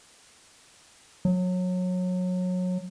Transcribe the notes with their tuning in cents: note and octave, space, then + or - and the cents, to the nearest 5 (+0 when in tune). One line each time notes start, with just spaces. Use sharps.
F#3 -25